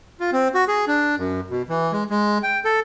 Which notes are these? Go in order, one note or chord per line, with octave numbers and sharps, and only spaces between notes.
F4
C4
F#4
G#4
D4
F#2
B2
E3
G#3
G#3
G5
A4